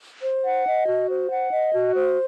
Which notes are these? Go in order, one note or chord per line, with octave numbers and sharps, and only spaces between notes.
C5
F#5
D#5
F#4
C5
F#5
D#5
F#4
C5